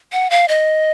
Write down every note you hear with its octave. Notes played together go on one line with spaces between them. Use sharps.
F#5
F5
D#5